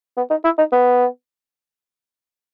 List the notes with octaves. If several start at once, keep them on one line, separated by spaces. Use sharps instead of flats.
B3
D#4
E4
D#4
B3